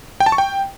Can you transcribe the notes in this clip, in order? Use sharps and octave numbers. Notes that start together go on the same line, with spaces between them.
G5
A5
C#6
G5